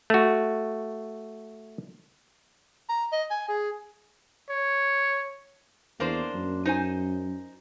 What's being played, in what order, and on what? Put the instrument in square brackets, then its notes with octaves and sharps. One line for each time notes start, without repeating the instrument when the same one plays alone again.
[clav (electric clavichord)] A3 F#4
[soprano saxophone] A#5
D#5
G#5
G#4
[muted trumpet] C#5
[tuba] E2 [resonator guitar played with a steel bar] A#3 D4 C5
[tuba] F#2
[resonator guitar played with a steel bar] D#4 C5 G#5